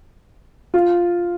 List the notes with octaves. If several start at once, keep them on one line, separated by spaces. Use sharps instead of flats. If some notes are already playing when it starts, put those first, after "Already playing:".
F4